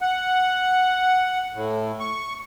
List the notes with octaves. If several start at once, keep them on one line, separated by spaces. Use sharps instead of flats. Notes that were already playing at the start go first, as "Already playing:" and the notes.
F#5
A2
C#6